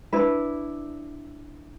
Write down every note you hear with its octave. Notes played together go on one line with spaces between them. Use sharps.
D4 E4 B4